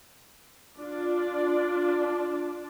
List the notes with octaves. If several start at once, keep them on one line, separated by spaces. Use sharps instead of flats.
D4 F4 D5